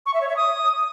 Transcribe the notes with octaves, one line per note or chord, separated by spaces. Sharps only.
C#6
E5
C#5
E5
D#6